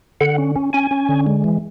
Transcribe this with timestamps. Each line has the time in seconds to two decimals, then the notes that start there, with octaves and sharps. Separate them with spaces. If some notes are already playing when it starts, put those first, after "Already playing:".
0.21 D3 F#5
0.38 C#4
0.56 C#4
0.73 C#4 G#5
0.91 C#4
1.09 D3
1.26 G#3
1.44 E3